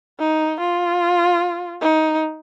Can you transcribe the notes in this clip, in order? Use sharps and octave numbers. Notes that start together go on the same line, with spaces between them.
D#4
F4
D#4